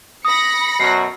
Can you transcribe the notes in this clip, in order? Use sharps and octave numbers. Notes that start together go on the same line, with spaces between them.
B5 D#6 A#6 C#7
F#2 B2 F#3 C7